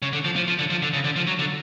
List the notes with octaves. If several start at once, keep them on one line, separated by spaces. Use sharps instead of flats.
C#3
D3
F3
F3
F3
D3
F3
D3
C#3
D3
F3
F#3
D3